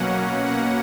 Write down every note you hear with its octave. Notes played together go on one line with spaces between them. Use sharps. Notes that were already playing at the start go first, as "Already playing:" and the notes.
Already playing: B2 F#3 A#3 C#4 F#5
B2 A#3 C#4 F#5